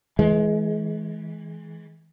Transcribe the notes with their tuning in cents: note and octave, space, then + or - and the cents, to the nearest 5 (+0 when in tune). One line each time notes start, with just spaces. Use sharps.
E3 -15 G#3 +25